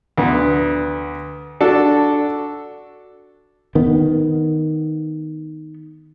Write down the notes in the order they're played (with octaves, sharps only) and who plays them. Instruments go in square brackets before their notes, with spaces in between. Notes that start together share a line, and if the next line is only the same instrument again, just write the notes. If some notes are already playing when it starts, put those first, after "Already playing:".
[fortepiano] D2 B3
D4 F#4 A4
[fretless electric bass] D#3 B3